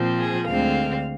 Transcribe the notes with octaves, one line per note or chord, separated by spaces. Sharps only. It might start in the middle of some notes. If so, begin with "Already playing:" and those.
Already playing: A#2 F3 C4
G#4
D2 D3 G#3 C4 F5